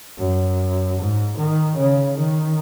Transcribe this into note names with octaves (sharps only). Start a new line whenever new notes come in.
F#2
G#2
D#3
C#3
D#3